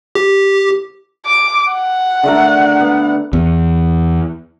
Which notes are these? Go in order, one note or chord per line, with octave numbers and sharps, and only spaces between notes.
G4
D6
F#5
D3 A3 A#4
B3
E2